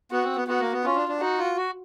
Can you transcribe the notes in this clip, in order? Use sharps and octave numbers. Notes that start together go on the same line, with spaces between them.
B3 F#4
C4
B3
B3 F#4
A#3
B3
C#4 F4
D4
D4
D#4 F#4
F4
F#4